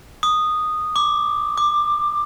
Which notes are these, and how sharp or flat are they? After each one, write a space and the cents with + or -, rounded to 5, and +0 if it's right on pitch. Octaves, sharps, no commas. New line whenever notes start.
D#6 -10
D6 +5
D6 +20